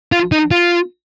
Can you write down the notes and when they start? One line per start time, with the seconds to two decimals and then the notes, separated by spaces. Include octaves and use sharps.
0.12 F4
0.32 D#4
0.51 F4